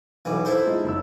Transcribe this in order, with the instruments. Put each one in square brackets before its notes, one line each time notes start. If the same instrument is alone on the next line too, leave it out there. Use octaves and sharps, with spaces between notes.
[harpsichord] B1 E3
E4 A4 C5
[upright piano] G#3 D#4 F4
F#1 E6